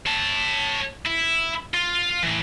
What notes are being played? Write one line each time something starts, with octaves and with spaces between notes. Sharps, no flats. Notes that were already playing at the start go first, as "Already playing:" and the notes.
C#5 A5
E4
F4
A2 E3